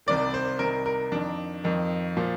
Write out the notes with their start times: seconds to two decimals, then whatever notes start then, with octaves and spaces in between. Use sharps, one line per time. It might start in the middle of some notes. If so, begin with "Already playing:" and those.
0.06 C2 C3 D#3 D5
0.34 C5
0.59 C2 C3 D#3 A#4
0.86 A#4
1.12 F2 D#3 D4
1.64 F2 D#3
2.17 A#2 F3